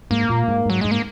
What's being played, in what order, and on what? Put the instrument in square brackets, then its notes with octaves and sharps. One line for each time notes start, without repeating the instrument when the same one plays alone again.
[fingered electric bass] G#2 [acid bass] A#3
[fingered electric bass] A#2
G#2
[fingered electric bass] G#2 [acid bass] F#3
[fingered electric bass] G#2 [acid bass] G#3
[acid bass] A#3